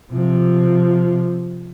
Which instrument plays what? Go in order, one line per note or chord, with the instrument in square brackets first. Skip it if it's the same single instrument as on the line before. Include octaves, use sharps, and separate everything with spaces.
[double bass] C3 F3